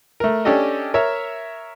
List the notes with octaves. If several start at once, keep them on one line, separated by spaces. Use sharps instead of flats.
A3 A#4
C#4 D4 G4 A4 D#5
A#4 C#5 E5